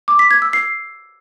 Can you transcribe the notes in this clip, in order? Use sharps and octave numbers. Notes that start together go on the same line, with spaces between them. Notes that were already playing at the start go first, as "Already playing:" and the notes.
D6
B6
G#6
E6
C7